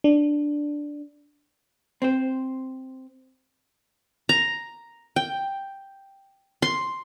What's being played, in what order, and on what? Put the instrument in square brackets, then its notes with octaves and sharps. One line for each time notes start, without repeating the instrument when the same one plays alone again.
[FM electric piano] D4
[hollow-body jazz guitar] C4 C5
[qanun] A#5
G5
C6